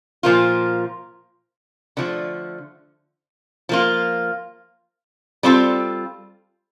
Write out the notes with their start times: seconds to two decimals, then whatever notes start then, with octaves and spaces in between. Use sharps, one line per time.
0.23 A#2 F3 A#3 F4
1.97 D3 F3 A3
3.69 F3 A#3 F4
5.43 G3 C4 F4 A4